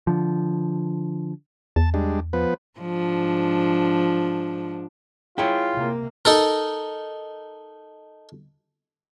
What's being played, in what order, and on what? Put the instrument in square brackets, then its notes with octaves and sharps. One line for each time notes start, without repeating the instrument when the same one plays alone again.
[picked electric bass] D3 F3
[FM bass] E2 [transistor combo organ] A5
[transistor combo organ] G3 G#3 D4
F3 B3 B4
[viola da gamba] G#2 F3 D4
[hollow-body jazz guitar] E4 G#4 C#5 [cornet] F4 [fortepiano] G5
[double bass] C3 A#3
[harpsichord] D#4 A4 A#4